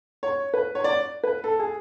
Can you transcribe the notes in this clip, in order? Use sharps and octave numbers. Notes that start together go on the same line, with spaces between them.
C#5
B4
C#5
D5
B4
A4
G#4